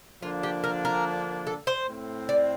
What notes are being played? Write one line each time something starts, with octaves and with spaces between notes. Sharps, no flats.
D3 F3 A#3 D4 F4
G4
A#4
A#4
A4
C5
A2 A3 C4
D5